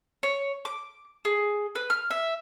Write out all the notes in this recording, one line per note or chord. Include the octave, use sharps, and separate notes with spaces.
C#5
D6
G#4
B4
F6
E5